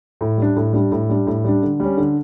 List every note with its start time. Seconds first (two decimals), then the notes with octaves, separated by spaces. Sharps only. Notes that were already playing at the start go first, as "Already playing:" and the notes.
0.21 A2
0.38 G3 D4
0.56 A2
0.73 G3 D4
0.91 A2
1.09 G3 D4
1.27 A2
1.44 G3 D4
1.63 D3
1.80 G3 C#4
1.97 D3